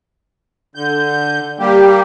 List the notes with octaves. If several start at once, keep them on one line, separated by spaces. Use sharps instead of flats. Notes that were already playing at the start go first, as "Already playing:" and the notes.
D3 G6
G3 A#3 G4